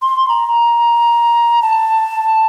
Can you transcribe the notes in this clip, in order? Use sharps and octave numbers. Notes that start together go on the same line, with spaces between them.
C6
A#5
A5